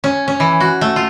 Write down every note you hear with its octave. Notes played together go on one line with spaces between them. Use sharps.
C#4
C#4
E3
F#4
A3
F4